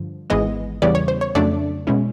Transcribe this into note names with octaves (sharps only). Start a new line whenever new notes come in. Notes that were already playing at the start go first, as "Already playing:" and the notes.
Already playing: G2 D3 F3
G#1 G#2 E3 G#3 B3 D#5
E2 C#3 E3 G3 B3 D5
C#5
C5
C#5
F2 C#3 F#3 A3 D4 D5
B2 G#3 C#4 E4